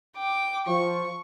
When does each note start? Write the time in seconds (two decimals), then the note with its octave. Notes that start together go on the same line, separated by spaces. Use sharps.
0.16 G5 D6
0.67 F3 C#6